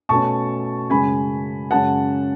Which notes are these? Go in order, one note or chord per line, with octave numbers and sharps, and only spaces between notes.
B2 A3 C#4 A5 C#6
F#2 C#3 G#3 G#5 B5
F#2 C#3 G#3 C#4 F#5 A5